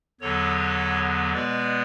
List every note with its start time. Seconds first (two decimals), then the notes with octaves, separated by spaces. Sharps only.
0.20 E2 D3 F#3 B3 A4 C#5
1.33 B2 G#3 B3 B4 D5